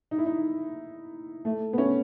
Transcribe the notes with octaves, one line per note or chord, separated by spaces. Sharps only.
D#4
E4
D#4
A3
B3
C#4